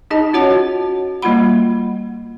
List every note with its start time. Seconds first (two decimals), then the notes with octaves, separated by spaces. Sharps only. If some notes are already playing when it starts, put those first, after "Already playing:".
0.11 D#4 G#4 D#5 A5
0.33 C#4 F4 F#4 C#5 F#5 A5
1.22 G3 A#3 F4 F#5 B5